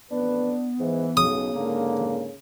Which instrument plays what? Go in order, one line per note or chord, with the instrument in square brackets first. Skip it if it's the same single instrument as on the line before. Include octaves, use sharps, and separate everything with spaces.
[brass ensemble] A1 F2 B4 [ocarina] B3 [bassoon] D4
[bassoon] G#2 [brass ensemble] E3
[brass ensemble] B1 [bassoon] C#3 [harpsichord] D#6
[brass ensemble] G#2 D3 A#3